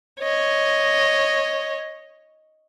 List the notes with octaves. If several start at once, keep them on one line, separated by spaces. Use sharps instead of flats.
C#5 D#5